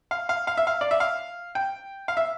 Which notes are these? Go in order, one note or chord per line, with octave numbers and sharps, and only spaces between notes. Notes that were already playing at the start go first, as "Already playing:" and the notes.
F5
F5
F5
E5
F5
D5
E5
F5
G5
F5
E5